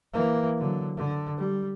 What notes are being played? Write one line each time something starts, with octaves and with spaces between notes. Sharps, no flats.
E3 A#3
D3 F#3
D3
G3